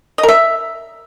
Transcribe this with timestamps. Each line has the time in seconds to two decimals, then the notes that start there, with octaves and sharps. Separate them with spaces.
0.18 D#5
0.23 A#4
0.28 E5